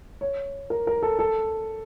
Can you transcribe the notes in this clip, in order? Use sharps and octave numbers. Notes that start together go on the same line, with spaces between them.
C#5
A#4
A#4
A4
A4